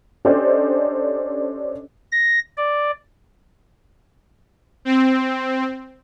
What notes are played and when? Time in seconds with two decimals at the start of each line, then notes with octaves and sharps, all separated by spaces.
0.25 C#4 D4 G4 A4 C5 D#5
2.12 A#6
2.57 D5
4.85 C4